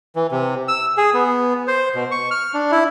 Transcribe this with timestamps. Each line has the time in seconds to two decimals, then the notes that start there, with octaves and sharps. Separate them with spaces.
0.16 E3
0.31 C3
0.68 E6
0.97 G#4
1.14 B3
1.68 C5
1.95 B2
2.11 C#6
2.31 F6
2.54 D4
2.71 E4